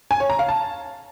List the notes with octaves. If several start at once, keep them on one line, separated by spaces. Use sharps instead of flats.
G#5
C#5
A#5
F5
A5